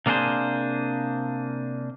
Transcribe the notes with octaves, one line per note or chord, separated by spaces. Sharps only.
C3 A#3 D4 G#4 C5